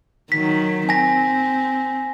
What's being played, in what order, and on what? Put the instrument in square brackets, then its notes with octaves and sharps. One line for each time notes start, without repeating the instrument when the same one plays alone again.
[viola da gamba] D#3 F#3 [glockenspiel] B6
[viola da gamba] C4 [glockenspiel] G#5 A#6 B6